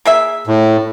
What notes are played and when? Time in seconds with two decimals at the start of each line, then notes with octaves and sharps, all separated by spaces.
0.05 A#3 G#4 E5
0.47 A2